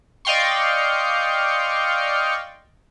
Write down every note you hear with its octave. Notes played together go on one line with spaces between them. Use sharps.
D5 D#5 F5 G5 C6 C#6